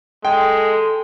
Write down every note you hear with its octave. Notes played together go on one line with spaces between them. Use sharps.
G#3 A4 G5